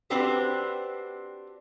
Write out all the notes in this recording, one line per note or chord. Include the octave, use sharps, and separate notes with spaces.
C4 D4 F#4 G4 B4 C5